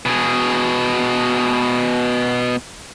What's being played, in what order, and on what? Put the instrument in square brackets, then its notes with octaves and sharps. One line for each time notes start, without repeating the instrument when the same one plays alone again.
[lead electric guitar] B2 G#4